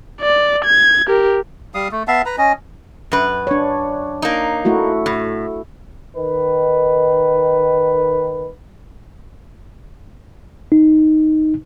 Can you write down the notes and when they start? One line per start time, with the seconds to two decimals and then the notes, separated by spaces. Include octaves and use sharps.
0.21 D5
0.65 G#6
1.07 G4 A#4
1.74 G3 F5 D#6
1.92 A3
2.08 B3 E5 F5 A5
2.26 B4 A#5
2.38 C#4 D#5
3.12 F#2 B4
3.47 D4 C#5
4.22 A#3 D#4
4.65 A3 E4 F#4
5.06 A2
6.16 D#3 B4
10.72 D#4